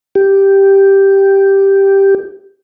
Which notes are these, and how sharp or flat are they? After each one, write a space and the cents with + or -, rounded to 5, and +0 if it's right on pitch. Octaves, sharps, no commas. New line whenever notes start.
G4 +0